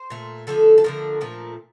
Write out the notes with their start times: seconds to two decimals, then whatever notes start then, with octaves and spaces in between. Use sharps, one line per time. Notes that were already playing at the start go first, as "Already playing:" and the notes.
Already playing: C5
0.10 A#2 A3
0.47 D3 F3 A3 A4
0.78 A4
0.84 D3 F3 A3 A#4
1.21 A#2 F3 A3